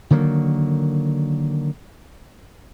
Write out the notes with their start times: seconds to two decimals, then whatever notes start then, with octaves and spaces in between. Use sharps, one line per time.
0.10 D3 D#3 F#3 A#3